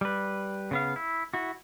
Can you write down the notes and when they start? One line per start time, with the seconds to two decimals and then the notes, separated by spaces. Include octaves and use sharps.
0.01 G3 B4
0.71 C#3 B3 F5
0.96 E4
1.34 E4 F#4